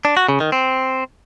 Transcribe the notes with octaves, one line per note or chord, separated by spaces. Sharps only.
D4
F#4
C#3
D#3
C4